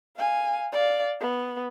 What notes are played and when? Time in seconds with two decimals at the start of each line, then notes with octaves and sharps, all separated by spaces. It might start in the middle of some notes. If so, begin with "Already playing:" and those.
0.16 F5 G#5
0.72 D5 F5
1.20 B3